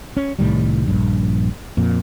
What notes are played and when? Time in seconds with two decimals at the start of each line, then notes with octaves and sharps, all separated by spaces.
0.17 C#4
0.39 C2 A2 D#3 G3
0.87 A#1 G2
1.77 F2 A#2